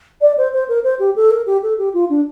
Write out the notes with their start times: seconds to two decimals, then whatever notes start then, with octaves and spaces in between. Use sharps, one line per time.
0.21 D5
0.37 C5
0.52 C5
0.68 A#4
0.83 C5
0.99 G4
1.15 A4
1.30 A#4
1.46 G4
1.62 A4
1.78 G4
1.93 F4
2.09 D4